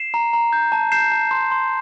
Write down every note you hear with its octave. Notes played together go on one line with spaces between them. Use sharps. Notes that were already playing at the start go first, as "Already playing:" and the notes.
Already playing: C7 E7
A#5
A#5
G6
A5
G6 C7 E7
A5
C6
C6